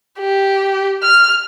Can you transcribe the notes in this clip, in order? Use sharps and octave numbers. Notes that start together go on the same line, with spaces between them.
G4
F6